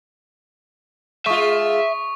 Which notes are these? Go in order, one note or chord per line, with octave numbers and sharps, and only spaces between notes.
G#3 F4 E5 C#6 D#6